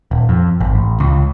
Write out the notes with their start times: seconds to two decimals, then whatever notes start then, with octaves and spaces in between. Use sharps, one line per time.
0.11 D#1
0.29 F2
0.60 G#1
0.75 A1
1.00 C#2